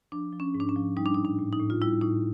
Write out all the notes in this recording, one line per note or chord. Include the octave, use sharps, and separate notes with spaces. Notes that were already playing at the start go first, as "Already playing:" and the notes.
F3 D4
F3
C#4
G#2
D4
C#4
F3
G3 D#4
D4
D#4
A2
D4
A2
D#4
A2
F4
G3 E4
A2 D#4